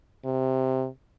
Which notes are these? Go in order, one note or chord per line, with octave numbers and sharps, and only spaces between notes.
C3